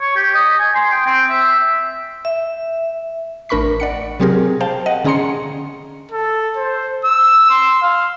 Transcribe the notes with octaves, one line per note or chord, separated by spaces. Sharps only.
C#5
G4
D#5
G#5
C6
G5
C4
E5
E5
A1 D4 A#4 B5 C#6 B6
D5 F#5 C#7
C3 F#3 C4 G4 G#4 A#4
C5 F5 G5 A5
D#5 F#5
D3 C#4 G#4 A#5 C6 C#7
A4
C5
E6
C6
F5